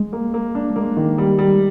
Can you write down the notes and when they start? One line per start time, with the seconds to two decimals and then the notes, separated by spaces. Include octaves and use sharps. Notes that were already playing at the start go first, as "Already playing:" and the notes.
Already playing: G#3
0.13 A#3
0.34 A#3
0.55 D4
0.76 G#3 A#3
0.97 D#3
1.18 G3
1.39 G3